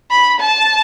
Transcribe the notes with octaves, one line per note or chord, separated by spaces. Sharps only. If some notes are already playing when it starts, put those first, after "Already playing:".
B5
A5